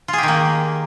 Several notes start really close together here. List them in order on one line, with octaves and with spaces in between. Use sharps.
F4 G#4 G4 D#3 A#3